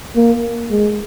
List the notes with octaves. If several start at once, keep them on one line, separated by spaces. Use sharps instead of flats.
A#3
G#3